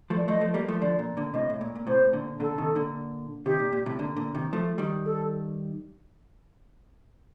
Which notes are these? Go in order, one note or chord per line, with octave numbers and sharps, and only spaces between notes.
F3 A3
D5
F3 A3 D#5
F3 A3
G3 A#3
F3 A3
D3 F3 D5
A#2
A#2 D3
A2 C3 D#5
A2
A#2
A#2
A2 C3 C5
A#2 D3
A#2 D3 A4
C3 D#3
A#2 D3
C3 D#3 G4
A#2
A#2
A2 C3
A#2 D3
A#2 D3
C3 D#3
F3 A3
D#3 G3
A4